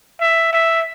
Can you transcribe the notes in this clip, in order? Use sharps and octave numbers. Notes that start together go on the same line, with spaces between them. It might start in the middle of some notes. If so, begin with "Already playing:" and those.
E5
E5